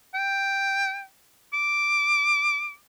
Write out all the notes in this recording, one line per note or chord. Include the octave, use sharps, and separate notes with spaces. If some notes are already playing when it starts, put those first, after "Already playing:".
G5
D6